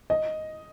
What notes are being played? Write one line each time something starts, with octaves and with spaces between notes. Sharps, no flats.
D#5